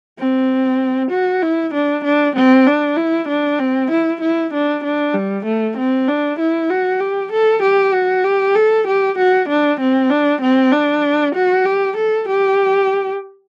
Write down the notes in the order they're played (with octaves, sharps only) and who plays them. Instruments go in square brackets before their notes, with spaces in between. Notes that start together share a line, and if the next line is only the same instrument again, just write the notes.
[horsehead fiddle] C4
F#4
E4
D4
D4
C4
D4
E4
D4
C4
E4
E4
D4
D4
G3
A3
C4
D4
E4
F#4
G4
A4
G4
F#4
G4
A4
G4
F#4
D4
C4
D4
C4
D4
F#4
G4
A4
G4